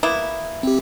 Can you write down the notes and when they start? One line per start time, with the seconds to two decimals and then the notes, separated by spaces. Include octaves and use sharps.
0.03 A#3 B3 E4
0.63 C4 G4